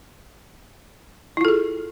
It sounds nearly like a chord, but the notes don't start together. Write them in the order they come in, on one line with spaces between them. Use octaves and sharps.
E4 F4 A4 G#4